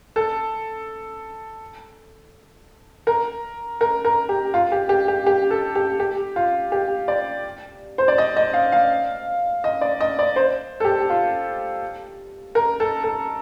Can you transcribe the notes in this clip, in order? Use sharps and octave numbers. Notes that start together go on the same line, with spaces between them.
A4
A#4
A#4
A#4
G4
F4
G4
G4
G4
G4
A4
G4
G4
F4
G4
D5
C5
D5
D#5
D#5
F5
F5
D#5
D5
D#5
D5
C5
A4
G4
F4
A#4
A4
A4